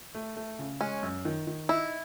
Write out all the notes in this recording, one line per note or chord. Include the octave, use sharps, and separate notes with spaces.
A3
A3
C#3
G#3 C#4
F#2
D#3
D#3
D#4 E4